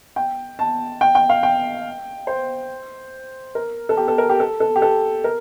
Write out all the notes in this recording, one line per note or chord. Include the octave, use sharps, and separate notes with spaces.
G5
A5
G5
G5
F5
G5
C5
A#4
A4
G4
A4
A#4
G4
A4
A4
G4
A4
A#4